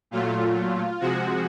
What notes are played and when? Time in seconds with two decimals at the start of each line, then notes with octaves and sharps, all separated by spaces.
0.11 A#2 F#3 A3 F4
1.00 C3 F3 G#3 F#4